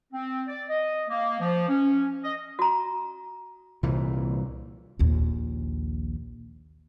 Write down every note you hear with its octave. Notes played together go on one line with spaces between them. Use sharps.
C4
D5
D#5
A#3
F3
C#4
D#5
F#4 A#5
C2 A#2 E3
A#1 D#2